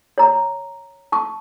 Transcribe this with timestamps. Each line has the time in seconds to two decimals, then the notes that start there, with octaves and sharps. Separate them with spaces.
0.18 C#5 A#5
1.12 A5 C#6